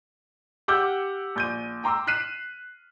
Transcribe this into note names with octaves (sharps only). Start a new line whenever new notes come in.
G4 F#5 D6 E6 F6 G6
A#1 G6 D#7
G5 A#5 C6 D6 E6
F6 F#6 B6 C7 D#7 E7